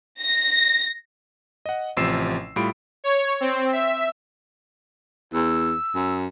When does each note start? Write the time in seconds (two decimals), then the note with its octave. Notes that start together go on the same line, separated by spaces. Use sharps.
0.22 A#6
1.66 D#5 F#5
1.97 A1 C3 F3 E6 C7 E7
2.56 A2 G3 F4 B5 D7
3.04 C#5
3.41 C4
3.72 E5
5.34 E2 E6
5.95 F#2